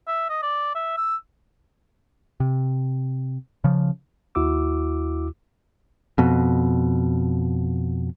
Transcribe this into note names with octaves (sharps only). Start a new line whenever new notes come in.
E5
D#5
D5
E5
E6
C3
C#3 F3
D#2 E4 F#4 D6 E6
F2 B2